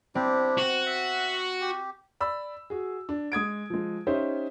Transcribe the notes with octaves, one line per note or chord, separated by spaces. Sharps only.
C4 D4 E4 G4
F#4
E5
G4
D5 B5 E6
F#4 G#4
D4
G#3 D#6 G#6 D7
F3 G#3
C#4 D#4 G4 C5 C#5 E5